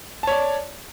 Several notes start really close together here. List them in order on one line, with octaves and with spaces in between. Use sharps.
A5 C#5 D5